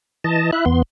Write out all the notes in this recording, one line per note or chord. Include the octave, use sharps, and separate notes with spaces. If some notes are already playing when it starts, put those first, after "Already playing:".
E3 D#5 A5
E4 E5 F#6
E2 B3 C6